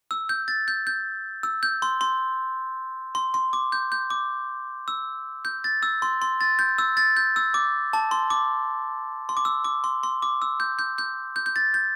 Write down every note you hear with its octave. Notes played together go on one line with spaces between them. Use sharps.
E6
G6
A6
G6
G6
E6
G6
C6
C6
C6
C6
D6
G6
G6
D6
E6
G6
A6
E6
C6
C6
A6
G6
E6
A6
G6
E6
D6
A5
C6
D6
C6
D6
E6
D6
C6
C6
D6
E6
G6
G6
G6
G6
G6
A6
G6